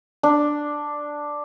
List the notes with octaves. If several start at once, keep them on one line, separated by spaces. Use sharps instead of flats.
D4